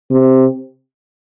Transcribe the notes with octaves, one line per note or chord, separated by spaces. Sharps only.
C3